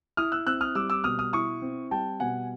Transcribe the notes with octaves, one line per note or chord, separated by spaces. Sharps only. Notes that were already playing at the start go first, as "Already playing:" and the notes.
E4 D#6 F6
E6 F#6
C4 E6 F#6
D#6 F6
G3 D6 E6
D6 E6
B2 D#6 F6
D#6 F6
E4 C#6 D#6
C4
G3 G5 A5
B2 F#5 G#5